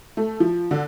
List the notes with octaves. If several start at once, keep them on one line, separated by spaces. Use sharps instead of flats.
A3
F3
D3